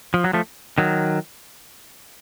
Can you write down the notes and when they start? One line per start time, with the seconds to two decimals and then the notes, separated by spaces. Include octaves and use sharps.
0.14 F3
0.24 F#3
0.33 F3 A3
0.78 D#3 F#3